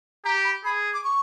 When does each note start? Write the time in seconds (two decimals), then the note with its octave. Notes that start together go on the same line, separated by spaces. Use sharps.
0.25 G4 A#5
0.44 B5
0.64 G#4 B5
0.94 D6
1.04 C#6